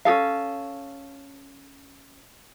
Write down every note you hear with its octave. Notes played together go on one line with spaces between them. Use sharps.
C#4 G#4 A4 F5